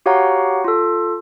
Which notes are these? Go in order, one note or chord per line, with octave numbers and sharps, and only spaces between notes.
F#4 G4 C#5 F5 F#5 A#5
F4 A4